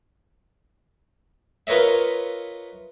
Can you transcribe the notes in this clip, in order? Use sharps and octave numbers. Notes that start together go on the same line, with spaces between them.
F4 A#4 B4 C#5 D#5 E5